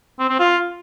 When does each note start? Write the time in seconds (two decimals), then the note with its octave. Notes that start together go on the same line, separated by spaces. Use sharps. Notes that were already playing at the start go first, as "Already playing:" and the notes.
0.19 C4
0.29 C4
0.40 F4